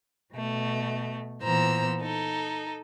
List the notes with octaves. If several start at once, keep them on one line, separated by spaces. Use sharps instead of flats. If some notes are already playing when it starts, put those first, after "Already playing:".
B2 A3
A#2 E3 B3 C5 A#5 E6
D#4 A4